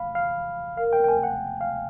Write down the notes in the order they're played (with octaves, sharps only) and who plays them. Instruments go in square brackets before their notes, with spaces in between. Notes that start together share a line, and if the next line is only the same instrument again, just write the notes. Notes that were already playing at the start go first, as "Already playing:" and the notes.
Already playing: [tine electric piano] F5 B5
F5
[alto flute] A#4 [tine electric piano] F5
[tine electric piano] G5
G5
G#5
F#5
F5